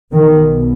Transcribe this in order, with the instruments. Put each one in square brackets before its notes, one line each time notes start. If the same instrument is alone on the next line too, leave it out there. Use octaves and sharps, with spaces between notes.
[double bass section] B1 B2 D#3